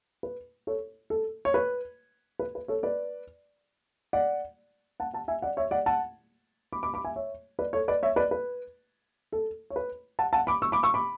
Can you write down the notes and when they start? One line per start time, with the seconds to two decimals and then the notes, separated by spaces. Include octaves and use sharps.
0.23 B4
0.67 A4 C#5
1.10 A4
1.45 C#5
1.54 B4
2.39 B4
2.55 B4
2.68 A4 C#5
2.83 B4 D5
4.13 D5 F#5
5.00 F#5 A5
5.14 F#5 A5
5.28 E5 G#5
5.42 D5 F#5
5.57 C#5 E5
5.71 D5 F#5
5.86 F#5 A5
6.73 B5 D6
6.83 B5 D6
6.94 B5 D6
7.05 E5 G#5
7.16 C#5 E5
7.59 B4 D5
7.73 A4 C#5
7.88 B4 D5
8.03 C#5 E5
8.16 B4 D5
8.31 B4
9.32 A4
9.70 C#5
9.76 B4
10.19 F#5 A5
10.33 F#5 A5
10.47 B5 D6
10.62 C#6 E6
10.72 B5 D6
10.83 C#6 E6
10.94 B5 D6